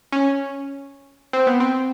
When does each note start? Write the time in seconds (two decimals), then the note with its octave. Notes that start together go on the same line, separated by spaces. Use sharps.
0.12 C#4
1.33 C4
1.47 B3
1.60 C4